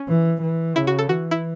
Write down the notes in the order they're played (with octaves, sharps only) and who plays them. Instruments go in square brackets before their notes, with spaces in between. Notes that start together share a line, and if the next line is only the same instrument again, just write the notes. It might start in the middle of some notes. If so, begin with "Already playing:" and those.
Already playing: [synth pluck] C#4
[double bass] E3
E3
[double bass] C#3 [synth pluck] E4
[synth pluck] F#4
A4
[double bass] E3 [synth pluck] F#4
[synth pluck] E4